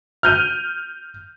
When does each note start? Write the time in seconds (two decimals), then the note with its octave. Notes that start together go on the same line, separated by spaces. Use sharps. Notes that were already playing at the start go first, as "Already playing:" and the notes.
0.23 F6 G6 D#7